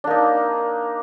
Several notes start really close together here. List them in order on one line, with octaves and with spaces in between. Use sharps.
D4 A#3 D#4